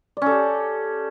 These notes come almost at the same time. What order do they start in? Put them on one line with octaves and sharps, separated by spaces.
D5 C#4 A4 G4